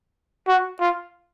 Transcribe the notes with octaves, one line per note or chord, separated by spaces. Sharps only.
F#4
F4